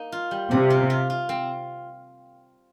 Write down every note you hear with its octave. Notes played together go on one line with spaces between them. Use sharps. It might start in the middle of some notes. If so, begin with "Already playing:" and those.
Already playing: A#3 D#4
F4
G3
C3 G3
F4
F4
F4
C4